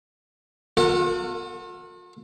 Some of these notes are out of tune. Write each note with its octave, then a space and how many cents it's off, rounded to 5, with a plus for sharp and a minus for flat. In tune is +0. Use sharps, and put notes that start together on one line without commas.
F4 +45 A4 +45 F#5 -10